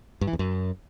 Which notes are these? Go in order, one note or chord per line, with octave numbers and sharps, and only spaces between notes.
G2
E3
E2
F#2